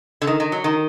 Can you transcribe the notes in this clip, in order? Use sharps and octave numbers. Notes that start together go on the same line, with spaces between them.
D3
D#3
D#3
F#3
D#3